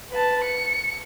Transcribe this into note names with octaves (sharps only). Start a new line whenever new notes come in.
B4 A5
C#7